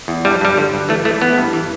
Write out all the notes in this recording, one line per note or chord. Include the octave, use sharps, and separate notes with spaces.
E2
G2 G3
G2 G3
D3
G2
E3 A3
E3 A3
E3 B3
G2
E3